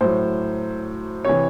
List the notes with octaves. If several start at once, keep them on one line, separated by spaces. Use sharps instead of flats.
A2 F#3 C5
C3 E3 C#5